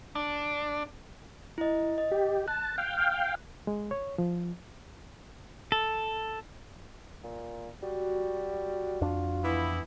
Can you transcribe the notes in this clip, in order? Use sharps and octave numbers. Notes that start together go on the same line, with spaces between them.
D4
E4 D#5
D#5
G4
A5 F#6
F5 G5
G#3
C#5
F3
A4
A#2
G3 F#4
F2 D4 F4
E3 B3 E4